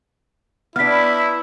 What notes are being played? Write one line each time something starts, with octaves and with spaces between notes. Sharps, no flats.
B3 D4 E4 F6 B6